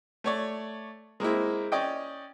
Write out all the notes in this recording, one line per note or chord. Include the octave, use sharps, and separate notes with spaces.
A3 C#5 D5
G#3 A#3 C4 E4
C#4 D5 D#5 G5